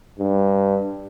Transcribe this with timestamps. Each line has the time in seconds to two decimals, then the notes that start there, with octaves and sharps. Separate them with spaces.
0.19 G2